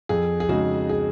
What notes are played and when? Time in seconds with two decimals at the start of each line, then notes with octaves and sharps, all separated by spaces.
0.09 F2 G#4
0.40 G#4
0.49 C#3 G#3 D#4 F#4
0.89 G#4